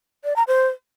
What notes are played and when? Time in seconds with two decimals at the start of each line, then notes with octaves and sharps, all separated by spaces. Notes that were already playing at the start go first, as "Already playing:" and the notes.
0.24 D5
0.36 A#5
0.48 C5